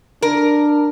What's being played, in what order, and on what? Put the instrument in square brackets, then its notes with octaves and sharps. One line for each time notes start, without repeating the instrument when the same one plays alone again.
[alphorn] D4 [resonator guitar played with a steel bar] A#4